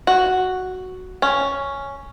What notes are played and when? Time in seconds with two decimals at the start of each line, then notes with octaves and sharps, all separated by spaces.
0.07 F#4
1.22 C#4